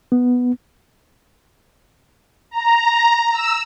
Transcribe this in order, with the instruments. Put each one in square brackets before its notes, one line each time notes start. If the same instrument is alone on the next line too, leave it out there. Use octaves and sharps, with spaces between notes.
[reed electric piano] B3
[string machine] A#5
E6